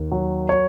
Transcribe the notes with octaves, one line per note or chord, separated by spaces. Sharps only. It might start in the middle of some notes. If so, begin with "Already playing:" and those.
Already playing: D#2
F#3
C#5